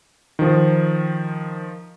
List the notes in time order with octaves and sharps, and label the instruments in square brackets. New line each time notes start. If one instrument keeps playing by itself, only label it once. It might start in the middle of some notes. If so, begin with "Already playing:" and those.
[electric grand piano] D#3 F3